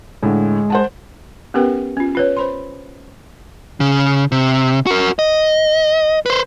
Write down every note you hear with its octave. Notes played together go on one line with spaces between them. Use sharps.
A2 D3 G#3
C5 F#5 A5
B3 C#4 G4 A#4 B4 G5
C#4 F4
F4 B4 C#5
C5 B5 C6
C#3
C3
F#4 A#4
D#5
B4 C5